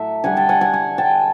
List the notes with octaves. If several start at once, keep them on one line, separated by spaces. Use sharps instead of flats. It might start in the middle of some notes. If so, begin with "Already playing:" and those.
Already playing: A2 F#3 A3 E5
D3 G3 F#5 G#5
G5 A5
F#5 G#5
F#5 G#5
F#5 G#5
G5 A5